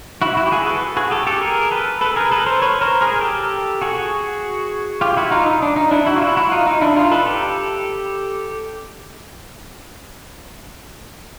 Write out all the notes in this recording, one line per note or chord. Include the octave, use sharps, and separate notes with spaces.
E4 F#4
E4 F#4
G4
F#4 G#4
A4 B4
F#4 G#4
G4 A4
G4 A4
G#4 A#4
A4 B4
A4 B4
G#4 A#4
A4 B4
A#4 C5
B4 C#5
A#4 C5
G#4 A#4
G4 A4
F#4 G#4
F4 G4
E4 F#4
D#4 F4
D#4
D4
D#4
D4 E4
E4 F#4
F4
E4 F#4
E4 F#4
D#4 F4
D#4
D4 E4
D#4 F4
A4 B4
G4 A4